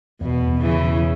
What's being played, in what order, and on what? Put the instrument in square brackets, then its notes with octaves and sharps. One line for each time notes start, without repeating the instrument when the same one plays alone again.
[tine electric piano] E2 [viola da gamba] B2
[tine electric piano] E2
[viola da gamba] C#3 E3
[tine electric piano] B2